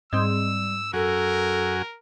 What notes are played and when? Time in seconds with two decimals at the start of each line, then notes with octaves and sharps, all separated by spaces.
0.13 G#2 G3 C4 E6
0.93 F#2 F#4 A4 A#4 G#5